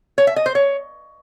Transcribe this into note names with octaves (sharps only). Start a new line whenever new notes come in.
C#5
E5
D#5
C5
C#5